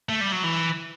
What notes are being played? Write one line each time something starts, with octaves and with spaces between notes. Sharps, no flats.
A3
G3
F#3
E3